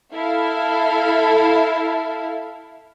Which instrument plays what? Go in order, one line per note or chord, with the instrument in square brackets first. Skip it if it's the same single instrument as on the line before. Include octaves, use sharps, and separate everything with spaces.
[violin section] E4 A4 E5 F5